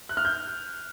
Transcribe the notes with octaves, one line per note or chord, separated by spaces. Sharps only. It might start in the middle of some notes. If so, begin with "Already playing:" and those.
F#6
F6
G6